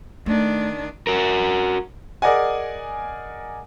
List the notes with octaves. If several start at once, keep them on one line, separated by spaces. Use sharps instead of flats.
D#3 A3 D4
F#4 A#4
G#4 A#4 D5 D#5 F#5 G#5